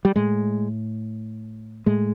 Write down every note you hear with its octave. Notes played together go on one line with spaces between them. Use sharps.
G3
A2 G#3
A2 G#3